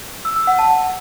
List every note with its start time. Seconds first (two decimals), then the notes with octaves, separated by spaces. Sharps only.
0.25 E6
0.36 E6
0.47 F#5
0.59 A5